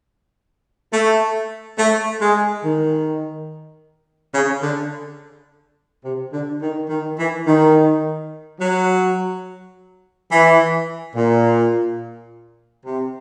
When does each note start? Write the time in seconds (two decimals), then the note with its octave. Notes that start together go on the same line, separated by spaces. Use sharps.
0.93 A3
1.79 A3
2.21 G#3
2.64 D#3
4.34 C#3
4.63 D3
6.05 C3
6.33 D3
6.62 D#3
6.90 D#3
7.18 E3
7.46 D#3
8.60 F#3
10.31 E3
11.16 A#2
12.86 C3